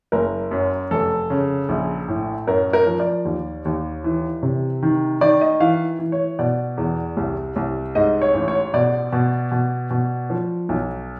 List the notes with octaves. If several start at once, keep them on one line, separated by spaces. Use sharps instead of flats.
F#1 A#4
F#2
F1 A4
C#3
A#1
A2
F#2 A#4
A#4
F3
D5
D#2
D#2
E3
C3
D#3
D#3 D5
D#5
E3 F5
E3
C#5
B2 D5
E2
C2
C2
G#2 D#5
C#5
A1
C#5
B2 D5
B2
B2
B2
F3
B1